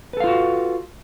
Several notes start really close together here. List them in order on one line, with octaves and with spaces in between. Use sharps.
B4 A4 F5 F4 F#4